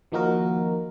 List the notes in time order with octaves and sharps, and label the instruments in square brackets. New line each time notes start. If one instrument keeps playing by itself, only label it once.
[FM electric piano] D#3 F3 A#3 D#4 F#4 A#4